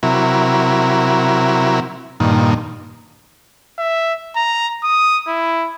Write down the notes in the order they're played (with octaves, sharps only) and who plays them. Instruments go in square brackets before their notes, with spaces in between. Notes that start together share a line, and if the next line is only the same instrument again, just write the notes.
[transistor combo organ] C3 F#3 E4 A#4
G2 A#2 D#3
[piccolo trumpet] E5
A#5
D#6
E4